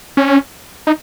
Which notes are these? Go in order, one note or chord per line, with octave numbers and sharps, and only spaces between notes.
C#4
D#4